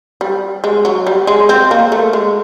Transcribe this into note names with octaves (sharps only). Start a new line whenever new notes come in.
G3
G#3
F#3
G3
G#3
C4
A#3
A3
G#3